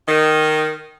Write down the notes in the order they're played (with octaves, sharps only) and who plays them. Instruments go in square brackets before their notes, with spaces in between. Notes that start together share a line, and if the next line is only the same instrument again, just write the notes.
[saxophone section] D#3